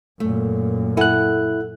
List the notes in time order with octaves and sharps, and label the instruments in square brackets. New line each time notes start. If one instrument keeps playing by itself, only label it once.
[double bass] F#2 A#2 [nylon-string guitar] A3
[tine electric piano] E4 F#6 [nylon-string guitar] A4 F#5 G#5